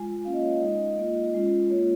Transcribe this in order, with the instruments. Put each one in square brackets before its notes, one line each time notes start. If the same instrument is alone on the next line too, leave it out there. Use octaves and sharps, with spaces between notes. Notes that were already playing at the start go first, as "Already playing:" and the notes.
Already playing: [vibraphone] G#3 F4 G#5
A#3 C#4 F4 F5
D#5
C#5
D#5
G#3 D#4
A#3 F4
G#3 C#4 F4
A#3 F4 C#5